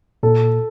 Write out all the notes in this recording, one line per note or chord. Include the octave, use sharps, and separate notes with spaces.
A#2 A4